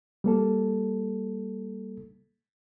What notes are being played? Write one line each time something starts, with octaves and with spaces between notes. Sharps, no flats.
G3 A#3 A4